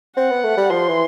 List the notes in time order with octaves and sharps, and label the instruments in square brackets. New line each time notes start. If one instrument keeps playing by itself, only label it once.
[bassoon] C4 [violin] F#5
[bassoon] B3
A3
G3
[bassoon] F3 [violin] C6
[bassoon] E3